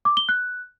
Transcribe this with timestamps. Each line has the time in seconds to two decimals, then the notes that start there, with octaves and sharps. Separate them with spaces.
0.05 D6
0.17 G7
0.29 F#6